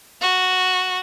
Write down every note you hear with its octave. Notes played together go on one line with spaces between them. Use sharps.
F#4